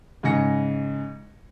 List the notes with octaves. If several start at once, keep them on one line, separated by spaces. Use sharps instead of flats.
G#2 C#3 G#5 A#6 C#7